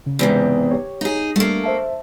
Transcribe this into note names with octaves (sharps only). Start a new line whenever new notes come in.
C#3
E2 G#2 C3
G4 C#5
D#4 G#4
G3 A3 A#3 D4
C5 E5 A5